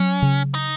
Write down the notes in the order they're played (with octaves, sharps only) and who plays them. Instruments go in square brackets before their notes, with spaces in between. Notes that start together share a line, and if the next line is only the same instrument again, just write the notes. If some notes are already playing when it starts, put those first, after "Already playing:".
Already playing: [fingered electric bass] F#3 [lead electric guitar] C#4
[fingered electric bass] C#3
[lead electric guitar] D#4